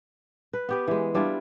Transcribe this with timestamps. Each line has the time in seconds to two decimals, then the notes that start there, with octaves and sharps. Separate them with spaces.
0.53 B4
0.69 B3 G4 B4
0.88 E3 G#3
1.15 G3 D4 E4 F4